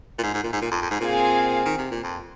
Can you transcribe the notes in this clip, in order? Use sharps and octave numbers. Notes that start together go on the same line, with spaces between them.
A#2
G#2
G#2
A#2
G#2
A#2
F2
F2
G#2
A#2 C4 G#4 F5 G#5
D#3
C3
A#2
F2